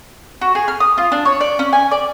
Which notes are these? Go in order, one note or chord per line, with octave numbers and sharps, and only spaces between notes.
F#4
G#4
F6
D#6
F4
D4
C#5
D5
C#4
G#5
D5